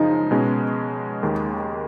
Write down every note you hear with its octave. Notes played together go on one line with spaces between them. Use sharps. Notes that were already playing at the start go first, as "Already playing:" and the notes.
Already playing: F#2 C#3 F3 G#3 D#4
B2 G#3 C#4
D#2 D#3 G#3